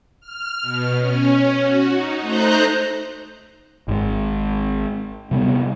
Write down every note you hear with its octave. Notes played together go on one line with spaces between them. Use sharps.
F6
B2
C#4
F#4
D#4
A3 D#4 C5 A#5 F#6 G6
G#1 G#2
C3 G3 A3 B3